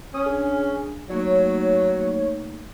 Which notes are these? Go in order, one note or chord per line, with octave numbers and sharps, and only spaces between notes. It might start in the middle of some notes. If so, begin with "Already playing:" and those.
C#4 D#6
D4 G#4
F#3 A3 A#3 D#4 C#5